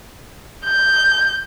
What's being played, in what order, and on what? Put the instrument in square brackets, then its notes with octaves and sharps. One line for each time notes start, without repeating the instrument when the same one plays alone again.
[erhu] G6